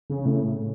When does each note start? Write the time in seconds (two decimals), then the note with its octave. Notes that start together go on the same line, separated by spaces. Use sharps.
0.10 C#3
0.25 A2